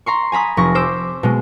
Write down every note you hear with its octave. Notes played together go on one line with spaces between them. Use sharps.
A#5 C6 C#6
G#5 A#5 B5 D#6
F1 C#6 A#6
C5 D6 E6
B2 G#3